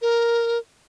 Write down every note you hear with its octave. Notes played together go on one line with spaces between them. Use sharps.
A#4